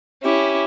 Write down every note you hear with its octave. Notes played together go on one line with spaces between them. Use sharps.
C#4 E4 G4